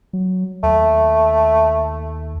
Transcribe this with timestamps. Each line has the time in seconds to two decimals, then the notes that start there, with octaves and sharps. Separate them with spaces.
0.13 F#3
0.63 D#2 A3